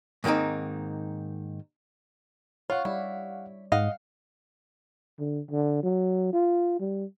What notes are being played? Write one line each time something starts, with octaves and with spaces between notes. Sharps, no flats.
G#2 D#3 A#3 C4 D#4
F4 C#5 F5 F#5
G3 E4 D5
G#2 D#5 F5 F#5
D3
D3
F#3
F4
G3